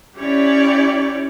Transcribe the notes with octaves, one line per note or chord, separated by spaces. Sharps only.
C#4 E4 G4 C#5 D5